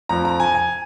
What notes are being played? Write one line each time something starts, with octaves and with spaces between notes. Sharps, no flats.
F2 F3 A#5
A#5
G#5
G#5